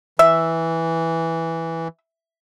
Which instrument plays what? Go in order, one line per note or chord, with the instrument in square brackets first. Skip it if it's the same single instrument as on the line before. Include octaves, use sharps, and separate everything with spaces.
[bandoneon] E3 [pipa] E5